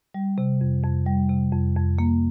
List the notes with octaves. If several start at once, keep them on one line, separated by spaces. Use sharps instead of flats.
G3
C3
F2
F2
G3
C3
F2
F2
A#3